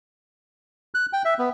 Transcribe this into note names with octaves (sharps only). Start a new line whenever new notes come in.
F#6
G5
E5
B3